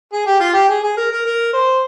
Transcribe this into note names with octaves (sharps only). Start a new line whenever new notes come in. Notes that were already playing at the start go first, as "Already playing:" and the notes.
G#4
G4
F4
G4
G#4
G#4
A#4
A#4
A#4
C5